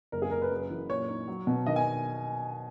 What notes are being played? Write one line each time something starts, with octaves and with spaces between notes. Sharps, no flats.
F#1 A#4
G#4
F#1 A#4
B4
F#2
E3
A#2 C#5
D#4
F#3
B2
D#3 D#5
G#5